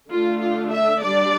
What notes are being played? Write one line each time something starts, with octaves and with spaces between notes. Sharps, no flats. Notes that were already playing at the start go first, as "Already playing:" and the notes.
D3 A3 D4 F4
F4
E5
G3 D4 D5